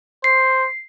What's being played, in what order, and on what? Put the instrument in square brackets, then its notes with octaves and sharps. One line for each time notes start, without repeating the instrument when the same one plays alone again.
[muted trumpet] C5 [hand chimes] C7